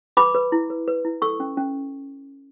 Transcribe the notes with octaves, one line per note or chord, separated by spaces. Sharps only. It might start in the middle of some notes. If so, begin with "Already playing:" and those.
B4 B5 D6
B4
E4
B4
B4
E4
A4 C#6 E6
C#4
C#4